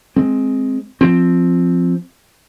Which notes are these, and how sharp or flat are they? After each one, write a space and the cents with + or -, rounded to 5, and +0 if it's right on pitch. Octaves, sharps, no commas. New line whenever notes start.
G#3 +5 C4 +0
F3 +0 C4 +0